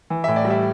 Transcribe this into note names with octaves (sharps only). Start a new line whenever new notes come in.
E3
A2 E5
D5
G3
E5